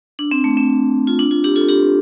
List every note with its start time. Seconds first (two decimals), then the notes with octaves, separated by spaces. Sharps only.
0.19 D4
0.31 C4
0.44 A3
0.57 C4
1.07 F4
1.19 D4
1.31 F4
1.44 D4 G4
1.56 F4 A4
1.69 D4 G4